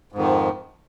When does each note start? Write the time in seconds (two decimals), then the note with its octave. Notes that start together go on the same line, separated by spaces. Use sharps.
0.12 G#2
0.15 F2
0.18 D#3
0.21 F3